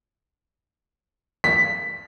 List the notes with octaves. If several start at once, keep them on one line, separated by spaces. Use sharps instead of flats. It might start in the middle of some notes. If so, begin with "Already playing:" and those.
B6